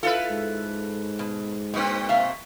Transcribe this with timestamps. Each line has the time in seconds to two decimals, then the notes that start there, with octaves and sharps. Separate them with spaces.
0.03 E4 F4 A4 B4
0.30 G#2
1.19 B2
1.74 B2 A#3 C4 D#4
2.09 C3 E5 F5